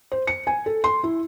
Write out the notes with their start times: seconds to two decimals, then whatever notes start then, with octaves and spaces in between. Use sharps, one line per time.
0.12 C5
0.27 C#7
0.47 G#5
0.66 A4
0.84 C6
1.03 E4